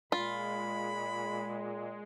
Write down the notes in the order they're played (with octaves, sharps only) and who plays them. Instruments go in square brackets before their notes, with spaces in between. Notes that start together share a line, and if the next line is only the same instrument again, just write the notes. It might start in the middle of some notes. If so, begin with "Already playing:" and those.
[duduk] A#2 [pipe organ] G#3 [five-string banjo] F4 [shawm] B5